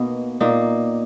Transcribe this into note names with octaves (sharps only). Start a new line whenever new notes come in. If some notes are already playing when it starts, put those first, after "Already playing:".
Already playing: B2 A#3 B3 D#4
A#2 A#3 D#4